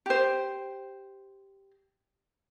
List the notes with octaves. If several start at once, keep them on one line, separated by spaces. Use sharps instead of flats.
G4 C5